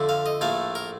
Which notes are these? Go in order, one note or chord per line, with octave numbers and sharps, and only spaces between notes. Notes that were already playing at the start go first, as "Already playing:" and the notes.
Already playing: F2 D3 A3
F5
D#5
A#1 A2 A3 F5
A#4